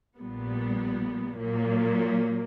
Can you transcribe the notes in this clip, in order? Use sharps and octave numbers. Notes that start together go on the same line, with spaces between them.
A#1 A#2 G3 B3
A#2 F#3 A#3